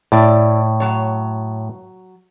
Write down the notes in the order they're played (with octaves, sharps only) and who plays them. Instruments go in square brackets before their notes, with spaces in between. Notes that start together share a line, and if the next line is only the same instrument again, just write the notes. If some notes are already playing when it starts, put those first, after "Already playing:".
[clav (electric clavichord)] A2 [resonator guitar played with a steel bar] E4 D5
[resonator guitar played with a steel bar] F#3 C#5